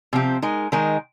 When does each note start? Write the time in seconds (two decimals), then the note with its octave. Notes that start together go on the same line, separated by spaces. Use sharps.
0.13 C3 F3 C4 G4
0.42 G#3 D#4 A#4
0.72 D#3 G#3 D#4 A#4